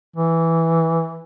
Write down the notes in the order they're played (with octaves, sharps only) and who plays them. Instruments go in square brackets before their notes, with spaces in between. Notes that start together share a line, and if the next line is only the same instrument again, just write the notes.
[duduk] E3